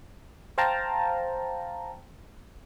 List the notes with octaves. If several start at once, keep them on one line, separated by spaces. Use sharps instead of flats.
C5 F5 G5 A5 A#5